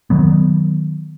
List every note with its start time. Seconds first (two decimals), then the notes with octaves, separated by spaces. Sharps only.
0.10 D#3 F#3 B3